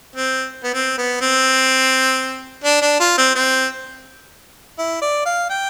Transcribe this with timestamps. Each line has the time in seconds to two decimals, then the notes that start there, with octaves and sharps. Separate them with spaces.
0.16 C4
0.64 B3
0.74 C4
0.98 B3
1.21 C4
2.64 D4
2.82 D4
3.00 F4
3.18 C4
3.35 C4
4.79 E4
5.02 D5
5.26 F5
5.50 G5